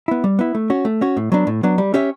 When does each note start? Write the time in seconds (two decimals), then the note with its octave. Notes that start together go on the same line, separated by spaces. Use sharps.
0.08 B3 E4
0.24 G3
0.39 B3 E4
0.55 A3
0.70 C#4 F#4 C#5
0.85 A3
1.01 C#4 F#4 C#5
1.17 A2
1.32 F#3 B3 D4
1.47 A2
1.63 F#3 B3 D4
1.78 G3
1.94 C#4 G4 C#5 E5